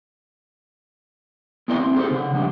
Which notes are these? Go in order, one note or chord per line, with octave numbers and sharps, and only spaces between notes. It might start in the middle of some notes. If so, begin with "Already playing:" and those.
B3 E4 A#4 D5 D#5 A5
C4 E4
D#4 G#4 A4 C5
C#3 F#5
F3 G3 D4 D#4